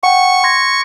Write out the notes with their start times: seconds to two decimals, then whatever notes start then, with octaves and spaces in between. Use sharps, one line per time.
0.03 F#5 G5 C#6
0.43 C6 G#6 A#6